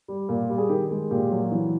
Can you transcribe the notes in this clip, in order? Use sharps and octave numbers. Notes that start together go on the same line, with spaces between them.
G3
A#2
G3
G#4
D#3 G4
G#3
A#2 G4
F#3
E3